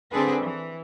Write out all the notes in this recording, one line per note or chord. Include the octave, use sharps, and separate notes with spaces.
D3 C4 D4 G#4 A4 B4
E3